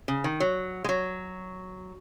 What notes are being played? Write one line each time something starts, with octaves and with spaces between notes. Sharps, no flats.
C#3
D#3
F#3
G#3
F#3